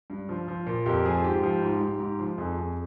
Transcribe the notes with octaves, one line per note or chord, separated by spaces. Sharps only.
G2
F3
F3
A#2
F2 G4 A#4
F3 G#4
G#2 G4
F3
G#2
G#2
G#2
F3
F2 G#4
F2